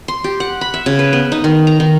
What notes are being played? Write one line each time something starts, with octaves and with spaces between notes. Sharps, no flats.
C6
G4
F#5
B5
E5
C#3
B4
B3
D#4
D#3
A#5
D#3